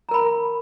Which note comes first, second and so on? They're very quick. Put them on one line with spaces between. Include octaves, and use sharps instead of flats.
A#5 A#4 B5